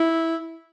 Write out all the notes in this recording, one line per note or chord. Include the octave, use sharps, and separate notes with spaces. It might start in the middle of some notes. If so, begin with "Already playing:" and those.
Already playing: E4